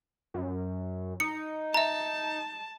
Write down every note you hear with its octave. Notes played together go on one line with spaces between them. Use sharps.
F#2
D#4 C#7
E5 A5 A#5